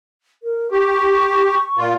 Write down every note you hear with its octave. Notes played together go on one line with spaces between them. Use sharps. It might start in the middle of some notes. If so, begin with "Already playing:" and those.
A#4
G4 C#6
A#2 F4